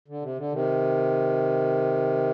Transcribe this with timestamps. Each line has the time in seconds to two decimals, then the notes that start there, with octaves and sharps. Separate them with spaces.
0.08 D3
0.22 C3
0.38 D3
0.52 C3 D#3